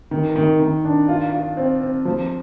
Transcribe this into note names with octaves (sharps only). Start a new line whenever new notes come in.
D#3
D#3
D#3
D4
F4
F4
C4
C4
F3